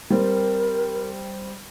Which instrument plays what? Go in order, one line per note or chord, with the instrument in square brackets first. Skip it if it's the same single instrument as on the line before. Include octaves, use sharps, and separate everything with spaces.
[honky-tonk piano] G3 C4 [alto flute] A#4